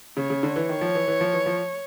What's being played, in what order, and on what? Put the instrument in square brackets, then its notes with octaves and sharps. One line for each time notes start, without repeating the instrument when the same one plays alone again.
[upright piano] C#3 [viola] C#5
[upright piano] C#3
D3
E3
[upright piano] D#3 [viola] C#5
[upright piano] F3
E3
E3
F3
E3
F3